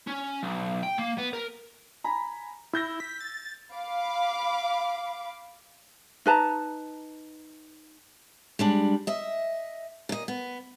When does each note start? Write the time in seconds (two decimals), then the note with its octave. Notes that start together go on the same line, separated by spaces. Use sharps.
0.08 C#4
0.43 B1
0.83 G5
0.98 A#3
1.18 B3
1.33 A#4
2.04 G#5 A#5 B5
2.73 E4 E6 G6 A#6
3.00 B6
3.20 A6
3.74 F5 B5 D6
6.26 D#4 B4 A5 A#5
8.59 G3 G#3 D4
9.07 D#5 E5
10.09 A#2 D#5
10.28 B3